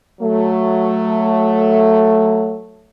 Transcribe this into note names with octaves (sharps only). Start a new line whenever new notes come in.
F#3 A3